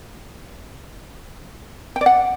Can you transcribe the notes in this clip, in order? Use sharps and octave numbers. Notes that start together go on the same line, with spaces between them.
G5
D5
F#5